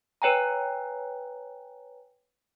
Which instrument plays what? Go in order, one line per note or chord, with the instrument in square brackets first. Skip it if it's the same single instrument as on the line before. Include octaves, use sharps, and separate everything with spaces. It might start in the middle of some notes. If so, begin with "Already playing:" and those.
[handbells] B4 C#5 G5 G#5 A#5